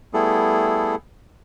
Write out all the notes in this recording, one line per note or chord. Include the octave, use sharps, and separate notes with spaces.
G3 A3 B3 E4 G#4 A4